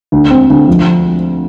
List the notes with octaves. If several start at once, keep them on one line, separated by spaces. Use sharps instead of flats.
D2
C4
D2
F3